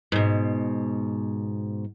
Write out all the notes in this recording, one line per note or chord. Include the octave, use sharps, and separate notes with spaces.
G#2 B2